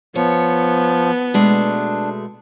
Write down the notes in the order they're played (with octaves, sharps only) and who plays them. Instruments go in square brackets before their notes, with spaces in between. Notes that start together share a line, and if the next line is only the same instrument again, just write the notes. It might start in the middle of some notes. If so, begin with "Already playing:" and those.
[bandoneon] F3 [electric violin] B3 [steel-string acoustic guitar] C#5
[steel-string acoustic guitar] B2 G#3 A3 [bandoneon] D4